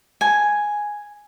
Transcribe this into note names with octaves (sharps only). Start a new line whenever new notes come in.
G#5